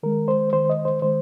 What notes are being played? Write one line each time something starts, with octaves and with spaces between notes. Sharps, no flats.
D#3 G#3 A#4
C5
D#3 G#3 C5
D#5
C5
D#3 G#3 C5